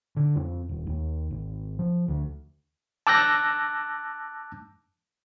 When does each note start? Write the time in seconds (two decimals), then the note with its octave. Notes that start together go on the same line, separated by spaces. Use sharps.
0.17 D3
0.36 F2
0.69 D#1
0.87 D#2
1.31 G#1
1.79 F3
2.08 D2
3.07 A5 D6 E6 F#6 G6 A#6